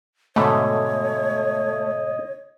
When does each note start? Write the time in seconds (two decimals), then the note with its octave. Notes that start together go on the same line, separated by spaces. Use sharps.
0.36 G#2 B2 D3 A3 C#5 D#5